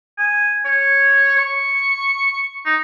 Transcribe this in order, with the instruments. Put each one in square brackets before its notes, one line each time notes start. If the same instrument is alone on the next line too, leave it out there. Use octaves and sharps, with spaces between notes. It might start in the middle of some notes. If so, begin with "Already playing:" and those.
[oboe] G#5
C#5
C#6
D#4